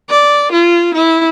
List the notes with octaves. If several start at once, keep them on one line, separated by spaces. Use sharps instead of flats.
D5
F4
E4